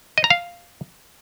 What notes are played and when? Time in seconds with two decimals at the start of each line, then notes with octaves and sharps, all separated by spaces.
0.18 D#5
0.24 A#5
0.30 F5